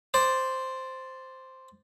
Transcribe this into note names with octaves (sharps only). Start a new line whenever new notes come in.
C5 D5